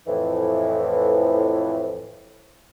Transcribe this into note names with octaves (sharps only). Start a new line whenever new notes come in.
F2 A2 E3